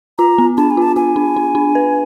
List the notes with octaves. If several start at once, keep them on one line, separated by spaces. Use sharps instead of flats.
F4 A#5
B3
D4 A5
G#5
F4 A5
F4 G#5
D4
D4
D4
B4